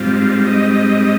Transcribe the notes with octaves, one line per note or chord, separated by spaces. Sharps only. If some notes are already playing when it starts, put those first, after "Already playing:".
Already playing: G#2 G3 C4 F4
D#5